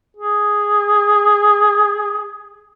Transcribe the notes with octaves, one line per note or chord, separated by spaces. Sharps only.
G#4